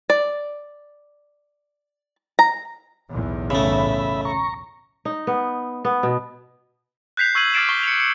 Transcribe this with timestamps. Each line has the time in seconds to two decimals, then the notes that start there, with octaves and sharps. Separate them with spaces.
0.10 D5
2.39 A#5
3.10 B1 E2 A2
3.50 C#3 A3 E5 B5
4.25 A#5 C#6
5.05 D#4
5.27 B3
5.85 B3
6.03 B2
7.17 F#6 G6 B6 C7 F7
7.35 C#6 E6 G#6 C7 D#7 F#7
7.54 D6 F6 A6 C7 D7 E7
7.69 C#6 G7
7.83 C#7 F7
8.00 C#7